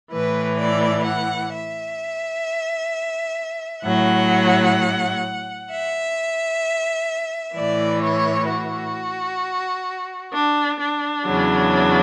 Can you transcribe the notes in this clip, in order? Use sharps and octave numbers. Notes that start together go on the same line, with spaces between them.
A2 E3 B4
D5
F#5
E5
A2 F#3 F#5
E5
A2 E3 D5
C#5
F#4
D4
D4
E2 C#3 F#3